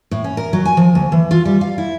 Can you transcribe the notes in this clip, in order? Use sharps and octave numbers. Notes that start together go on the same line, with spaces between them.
A2
C#4
A#4
F#3
G#5
F3
D2
E3
F4
G3
F5
E4